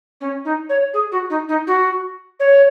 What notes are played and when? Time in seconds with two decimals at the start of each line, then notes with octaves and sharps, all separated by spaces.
0.21 C#4
0.45 D#4
0.69 C#5
0.94 G#4
1.12 F#4
1.30 D#4
1.49 D#4
1.67 F#4
2.40 C#5